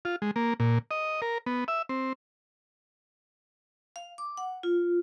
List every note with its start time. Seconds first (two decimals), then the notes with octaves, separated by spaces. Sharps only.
0.05 F4
0.22 G#3
0.36 A#3
0.60 A#2
0.91 D#5
1.22 A#4
1.46 B3
1.68 E5
1.89 C4
3.96 F5
4.18 D6
4.37 F#5
4.63 F4